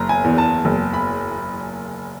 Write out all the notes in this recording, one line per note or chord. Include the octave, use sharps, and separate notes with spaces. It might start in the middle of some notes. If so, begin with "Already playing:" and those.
Already playing: F#1 A#5
G#5
E2
A5
F#1
B5